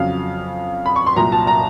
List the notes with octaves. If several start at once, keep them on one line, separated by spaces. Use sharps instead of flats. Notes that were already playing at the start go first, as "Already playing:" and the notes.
Already playing: F2 C#3 F#3 F5
B5
C#6
C6
C2 A#2 F#3 A#5
A5
A#5